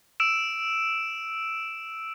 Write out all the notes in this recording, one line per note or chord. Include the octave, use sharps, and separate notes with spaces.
E6 D7 E7